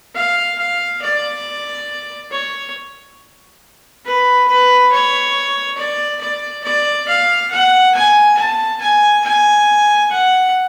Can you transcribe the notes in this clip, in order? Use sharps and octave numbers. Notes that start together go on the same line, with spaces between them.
F5
F5
D5
C#5
B4
B4
C#5
D5
D5
D5
F5
F#5
G#5
A5
G#5
G#5
F#5